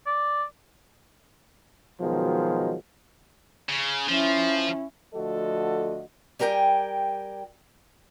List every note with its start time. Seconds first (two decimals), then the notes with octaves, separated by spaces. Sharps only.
0.06 D5
1.99 B2 D#3 F3 F#3 G#3
3.69 C#3
4.08 F3 C#4 E4
5.14 D3 F3 A3 F#4 A4 D#5
6.39 G3 G4 A#4 F5 G5 G#5